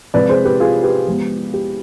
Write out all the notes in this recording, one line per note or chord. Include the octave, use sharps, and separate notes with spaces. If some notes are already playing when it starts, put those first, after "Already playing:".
C3 F3 G#3 B4 D5
G#4 C5
G4 B4
F4 G#4
G4 B4
F3 G#3 B3
G4